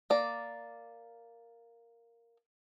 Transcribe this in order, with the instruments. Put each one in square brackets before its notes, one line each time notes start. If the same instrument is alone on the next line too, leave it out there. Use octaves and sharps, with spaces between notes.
[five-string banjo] A#3 D5